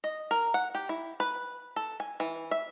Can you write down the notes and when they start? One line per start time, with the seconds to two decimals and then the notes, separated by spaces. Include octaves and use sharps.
0.04 D#5
0.31 A#4
0.54 F#5
0.75 G4
0.89 E4
1.20 B4
1.76 A4
2.00 G#5
2.20 E3
2.51 E5